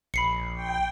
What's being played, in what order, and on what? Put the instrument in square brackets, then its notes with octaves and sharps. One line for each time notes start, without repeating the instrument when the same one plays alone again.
[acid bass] A#1 [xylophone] B5 C7 C#7
[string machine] G5